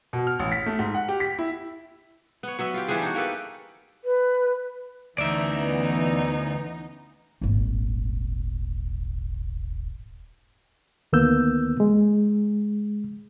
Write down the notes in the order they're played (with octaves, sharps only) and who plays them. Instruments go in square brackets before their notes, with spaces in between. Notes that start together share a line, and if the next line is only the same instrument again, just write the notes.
[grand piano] B2
F6
A1
B6
A3
G#2
F#5
G4
B6
E4
[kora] B3 C#5
F#3 B3 E5
F4 G4
E3 G3 D4 G#4
D#4 F#4
A#3 G4 A4 B4
[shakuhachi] B4
[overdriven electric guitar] D2 [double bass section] E3 B3 C#4 [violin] D#4 [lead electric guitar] D5 E5
[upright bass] D#1 G#1
[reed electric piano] D2 D#3 A#3 B3 E6 G6
G#3